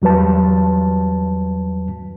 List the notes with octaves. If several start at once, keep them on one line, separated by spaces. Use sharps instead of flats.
E2 F#3 G3 B4 A5